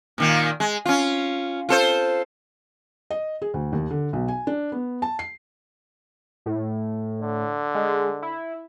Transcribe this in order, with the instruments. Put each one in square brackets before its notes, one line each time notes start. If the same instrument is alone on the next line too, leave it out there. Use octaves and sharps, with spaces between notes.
[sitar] A#2 D#3 A#3
G#3
C#4 F4
F4 A4 C5
[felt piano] D#5
G#4
D2
D#2
D3
B1
G#5
D4
B3
A5
C7
[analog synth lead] A2
[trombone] D3
[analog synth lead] G#3
E4